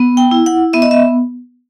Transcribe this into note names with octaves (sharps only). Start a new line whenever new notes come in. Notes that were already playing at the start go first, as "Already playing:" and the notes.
Already playing: B3
G5
E4
F#5
B3 E5
D#5
E5